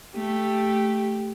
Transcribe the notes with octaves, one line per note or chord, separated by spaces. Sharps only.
A3 G4